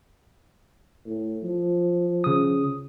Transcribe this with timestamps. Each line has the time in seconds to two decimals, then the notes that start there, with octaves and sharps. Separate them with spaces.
1.05 A2
1.43 F3
2.24 C#3 D#6